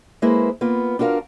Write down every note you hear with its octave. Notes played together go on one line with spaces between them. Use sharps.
G#3 A#3 E4 B4 C5
A#3 B3 F4
D4 F4 F#4 A#4 F5